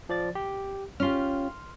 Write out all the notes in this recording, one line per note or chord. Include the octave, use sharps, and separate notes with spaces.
F3 D5 A6
G4
C#4 F4 G4 C6 F6